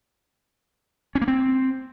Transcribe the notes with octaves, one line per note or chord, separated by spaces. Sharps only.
C#4
A#3
C4